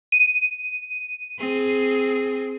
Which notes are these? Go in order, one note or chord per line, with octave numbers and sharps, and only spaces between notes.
D#7
C4 G#4